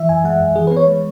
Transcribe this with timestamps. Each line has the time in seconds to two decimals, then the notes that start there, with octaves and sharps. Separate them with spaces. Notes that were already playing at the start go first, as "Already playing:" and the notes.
Already playing: E3 E5
0.09 F#2 G#5
0.24 G#3 F#5
0.40 F#2
0.56 E3 G#4
0.67 B3 B4
0.76 C#5
0.87 G#3